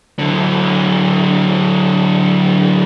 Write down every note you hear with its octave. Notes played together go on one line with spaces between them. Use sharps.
D3 F#3